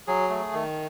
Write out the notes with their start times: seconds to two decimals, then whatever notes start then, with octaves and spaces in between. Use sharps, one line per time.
0.07 F#3 G#4
0.30 A3
0.53 D#3